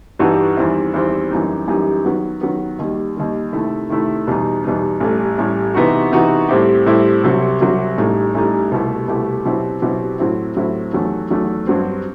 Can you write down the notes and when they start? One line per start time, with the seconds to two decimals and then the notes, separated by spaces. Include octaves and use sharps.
0.19 G2 E3 G3 D#4 F#4
0.57 E2 D#3 G3 C4 E4
0.94 E2 D#3 G3 C4 E4
1.31 F#2 E3 G3 D#4 G4
1.68 F#2 E3 G3 D#4 G4
2.05 D#3 F#3 B3
2.41 D#3 F#3 B3
2.79 D#2 D#3 G3
3.16 D#2 D#3 G3
3.53 C3 D#3 A3 E4
3.89 C3 D#3 A3 E4
4.27 E2 B2 G3 D#4
4.64 E2 B2 G3 D#4
5.00 A1 A2 G3
5.38 A1 A2 G3
5.74 C3 E3 B3 D#4 F#4
6.12 C3 E3 B3 D#4 F#4
6.48 A2 G3 C4 E4 G4
6.86 A2 G3 C4 E4 G4
7.23 C2 C3 F#3
7.61 C2 C3 F#3
7.98 A1 A2 G3 D#4
8.34 A1 A2 G3 D#4
8.71 C2 B2 A3 E4 G4
9.08 C2 B2 A3 E4 G4
9.45 B2 F#3 C4 E4 G4
9.82 B2 F#3 C4 E4 G4
10.19 A2 F#3 C4 E4
10.56 A2 F#3 C4 E4
10.93 E2 D#3 F#3 A3
11.30 E2 D#3 F#3 A3
11.67 G2 F#3 C4